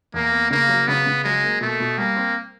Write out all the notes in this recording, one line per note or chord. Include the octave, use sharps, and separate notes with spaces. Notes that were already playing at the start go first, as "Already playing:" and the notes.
E2 A#3
B3
C#3 A#3
F#3
C#3 B3
C#3
F#3 G#3
A#3
B2 A3
B2
G3 A#3
C4